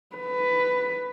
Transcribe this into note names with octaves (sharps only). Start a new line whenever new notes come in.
B4